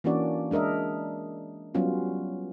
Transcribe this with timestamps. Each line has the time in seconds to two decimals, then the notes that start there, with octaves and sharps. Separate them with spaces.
0.04 E3 A#3 C#4 D4 F#4 D5
0.51 G#3 D4 A#4 D#5 E5
1.75 F#3 G3 B3 C#4 F4